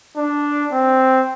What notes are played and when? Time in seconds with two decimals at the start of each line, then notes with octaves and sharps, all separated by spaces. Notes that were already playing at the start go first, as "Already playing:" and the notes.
0.17 D4
0.72 C4